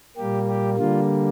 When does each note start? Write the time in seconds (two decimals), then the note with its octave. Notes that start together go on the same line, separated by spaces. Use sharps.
0.17 A#2 G3 A#3 G4
0.48 G4
0.79 D3 G3 A#3 F4